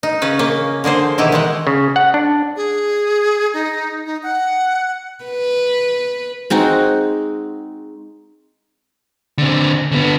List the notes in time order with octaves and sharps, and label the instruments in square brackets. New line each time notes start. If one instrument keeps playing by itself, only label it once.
[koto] D#4
C#3 C#4 B4
A#3 C#4
D3 A#3 G#4 C5
B2 D#3 E3 E4 G4
D#3 G#3 F#5
[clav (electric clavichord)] C#3
F#5
D4
[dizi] G#4
D#4
D#4
F#5
[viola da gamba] B4
[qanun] G#3 C4 D#4 F#4
[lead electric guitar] D3 C4
D3 B3